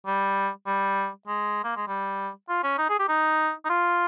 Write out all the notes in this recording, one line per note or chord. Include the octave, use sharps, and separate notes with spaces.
G3
G3
G#3
A#3
G#3
G3
F4
C#4
D#4
G#4
G4
D#4
D#4
F4